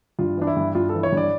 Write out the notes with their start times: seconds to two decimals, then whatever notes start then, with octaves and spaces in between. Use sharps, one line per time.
0.19 G2 F4
0.37 E3 D4
0.47 E4
0.56 G2
0.75 G2 F4
0.89 A4
0.94 E3
1.03 C#5
1.12 G2 D5